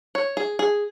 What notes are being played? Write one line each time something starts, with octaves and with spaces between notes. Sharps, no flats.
C#5
G#4
G#4